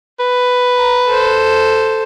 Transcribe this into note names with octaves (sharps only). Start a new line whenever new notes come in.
B4
A#5
A4 C5